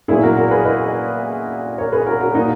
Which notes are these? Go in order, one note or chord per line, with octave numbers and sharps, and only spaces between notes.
A#2 F#3 B3 E4 G#4
F#4 A#4
F#4 A#4
G#4 B4
B4 D#5
A#4 C#5
G#4 B4
F#4 A#4
F#4 A#4
A#2 A#3 D#4 F#4